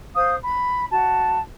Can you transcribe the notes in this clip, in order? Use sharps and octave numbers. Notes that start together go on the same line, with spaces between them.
C5 F5 D#6
B5
F#4 A5